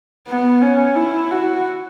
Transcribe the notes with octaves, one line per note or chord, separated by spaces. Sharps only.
B3
C#4
E4
F#4